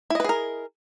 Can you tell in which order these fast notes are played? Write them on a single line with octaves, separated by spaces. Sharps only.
E4 D#5 B4 G#4 A#4